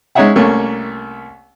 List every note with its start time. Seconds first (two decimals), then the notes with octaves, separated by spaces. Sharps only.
0.15 G#3 C#4 D#4 C#5 E5 F#5
0.36 C2 A3 A#3 C#4